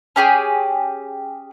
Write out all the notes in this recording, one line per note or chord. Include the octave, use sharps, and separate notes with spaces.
C#4 G4 G#4